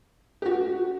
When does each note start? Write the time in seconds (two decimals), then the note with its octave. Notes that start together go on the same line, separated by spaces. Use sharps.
0.42 G4
0.46 F#4